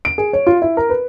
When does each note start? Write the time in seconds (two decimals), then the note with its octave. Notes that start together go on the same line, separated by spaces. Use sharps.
0.05 D7
0.18 G#4
0.33 C#5
0.47 F4
0.62 E4
0.77 A#4
0.89 B4